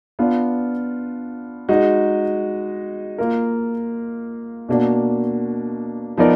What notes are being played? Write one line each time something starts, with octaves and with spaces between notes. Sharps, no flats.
B3 D4 F4
G#3 D#4 F#4
A#3 F4 A#4
B2 A#3 D4 F#4
F3 B3 D#4 A#4 D5